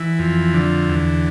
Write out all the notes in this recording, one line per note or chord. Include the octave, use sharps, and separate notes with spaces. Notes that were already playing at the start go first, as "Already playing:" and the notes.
Already playing: E3
F2
D3
E2